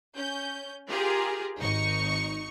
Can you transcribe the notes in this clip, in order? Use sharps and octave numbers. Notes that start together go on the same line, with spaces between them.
C#4 G6
F4 G4 G#4 A#4
G#1 D#4 C#6